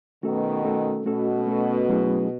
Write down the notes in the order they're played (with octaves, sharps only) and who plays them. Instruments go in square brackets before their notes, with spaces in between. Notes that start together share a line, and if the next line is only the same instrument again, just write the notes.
[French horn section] B2 D#3 [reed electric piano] A3 C#4 F#4 A4
[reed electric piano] A3 C#4 F#4 A4
[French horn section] B2 [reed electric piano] A3 C#4 F#4 A4
[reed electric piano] A3 C#4 F#4 A4
F#3 A3 C#4 E4 G#4